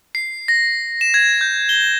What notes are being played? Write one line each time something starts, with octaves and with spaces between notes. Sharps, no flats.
C7
A#6
E7
G#6
G6
G7